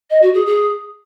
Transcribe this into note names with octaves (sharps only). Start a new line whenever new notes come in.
D#5
F#4
G#4
G#4